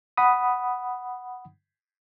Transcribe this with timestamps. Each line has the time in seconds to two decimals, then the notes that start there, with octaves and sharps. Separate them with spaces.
0.17 F#5 B5 D#6